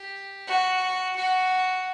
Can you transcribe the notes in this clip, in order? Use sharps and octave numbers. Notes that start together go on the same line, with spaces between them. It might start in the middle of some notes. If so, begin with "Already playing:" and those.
Already playing: G4
F#4
F#4